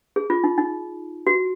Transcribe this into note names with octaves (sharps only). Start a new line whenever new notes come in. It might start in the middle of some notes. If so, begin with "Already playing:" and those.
G#4
F4
D#4
D#4
F#4